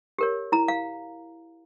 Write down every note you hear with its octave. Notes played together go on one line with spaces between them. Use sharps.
G4 A#4 C#5
E4 A#5
F5